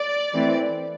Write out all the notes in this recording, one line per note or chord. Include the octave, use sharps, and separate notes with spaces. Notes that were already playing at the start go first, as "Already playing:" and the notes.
Already playing: D5
E3 A3 C4